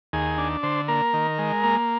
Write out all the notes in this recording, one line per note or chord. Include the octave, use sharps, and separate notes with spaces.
D#2 G#4
D4
D3 C5
A#3 A#4
D#3
G#3
A#3